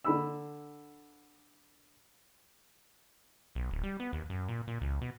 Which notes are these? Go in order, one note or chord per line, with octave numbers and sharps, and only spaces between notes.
D3 B5 E6
B1
D1
G3
B3
D#2
F#2
A#2
A#2
C#2
B2